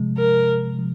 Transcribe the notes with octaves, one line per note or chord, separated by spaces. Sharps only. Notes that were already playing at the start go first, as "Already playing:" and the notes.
Already playing: C3 F3 G#3
A#4
C3 F3